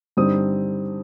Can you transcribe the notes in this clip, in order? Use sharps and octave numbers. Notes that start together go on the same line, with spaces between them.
G2 D3 G3 C4 D#4 D#6